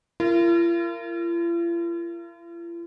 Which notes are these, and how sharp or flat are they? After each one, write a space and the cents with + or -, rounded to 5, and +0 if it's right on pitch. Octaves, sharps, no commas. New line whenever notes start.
F4 -45 A#4 -15